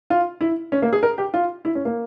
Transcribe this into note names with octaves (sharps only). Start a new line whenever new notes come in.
F4
E4
C#4
A#3
G#4
A#4
G4
F4
E4
C#4
A#3